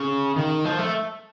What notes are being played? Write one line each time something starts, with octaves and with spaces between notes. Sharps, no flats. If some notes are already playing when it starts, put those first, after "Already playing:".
Already playing: C#3
D#3
F3
A3